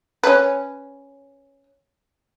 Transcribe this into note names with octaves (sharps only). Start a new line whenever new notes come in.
C#4 B4